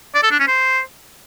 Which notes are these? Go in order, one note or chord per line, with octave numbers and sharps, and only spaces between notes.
D5
A4
D4
C#4
C5